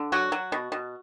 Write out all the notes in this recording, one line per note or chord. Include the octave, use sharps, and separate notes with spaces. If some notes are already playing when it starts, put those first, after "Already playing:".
Already playing: D3
F#3 F#4
F#3
B2
B2